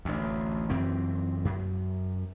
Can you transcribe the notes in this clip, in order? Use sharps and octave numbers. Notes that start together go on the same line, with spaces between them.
A1 D2
F#2 E3 C4
F#2